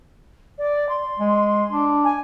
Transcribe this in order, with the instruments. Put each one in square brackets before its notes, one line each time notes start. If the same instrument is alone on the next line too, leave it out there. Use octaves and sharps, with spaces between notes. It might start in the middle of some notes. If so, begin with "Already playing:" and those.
[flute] D5
C6
[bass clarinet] G#3
D4
[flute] G#5